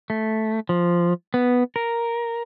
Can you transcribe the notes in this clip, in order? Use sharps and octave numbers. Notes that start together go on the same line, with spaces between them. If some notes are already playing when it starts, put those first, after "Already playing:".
A3
F3
B3
A#4